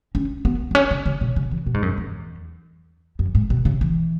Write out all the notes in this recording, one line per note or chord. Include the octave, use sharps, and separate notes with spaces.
C#4
B3
B3
C#4
C#3
C#3
B2
C#3
E3
B2
G#2
F#2
E2
F#2
G#2
B2
C#3
E3